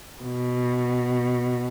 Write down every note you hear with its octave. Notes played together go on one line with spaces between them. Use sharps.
B2